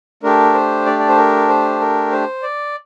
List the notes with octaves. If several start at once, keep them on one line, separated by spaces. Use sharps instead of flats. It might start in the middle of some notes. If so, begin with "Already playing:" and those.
A3 D4 G4 A#4
C5
D5
D5
C5
A#4
C5
A#4
C5
D5